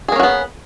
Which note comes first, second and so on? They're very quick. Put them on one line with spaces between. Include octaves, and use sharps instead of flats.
G#4 A#3 C#4 F#4 B3